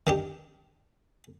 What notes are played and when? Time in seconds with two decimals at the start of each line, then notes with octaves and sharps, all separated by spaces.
0.07 D#3 D4 G4